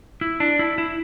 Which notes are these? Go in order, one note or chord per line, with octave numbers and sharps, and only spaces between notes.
E4
D4
E4
E4